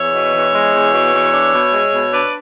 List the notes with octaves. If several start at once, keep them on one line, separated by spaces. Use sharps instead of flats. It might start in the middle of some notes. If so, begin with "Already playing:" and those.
Already playing: E2 C#5 E5
B2
E2
G#3
E2
B2
E2
D4
B2
G#3
B2
D4 B4 D5